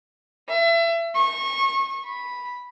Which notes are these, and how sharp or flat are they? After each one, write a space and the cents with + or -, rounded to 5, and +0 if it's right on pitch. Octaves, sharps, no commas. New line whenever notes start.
E5 +30
C#6 -25
B5 -5